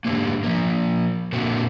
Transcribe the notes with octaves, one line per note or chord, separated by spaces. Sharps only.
G#2 D3 E3 G3 A#3
F3 A#3
A#2 D3 A#3 C4 F#4